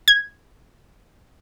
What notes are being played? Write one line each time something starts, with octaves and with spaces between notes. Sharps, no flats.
G#6